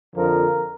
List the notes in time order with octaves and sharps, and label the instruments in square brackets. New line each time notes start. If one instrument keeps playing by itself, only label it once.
[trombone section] F2 D3 F3 A#4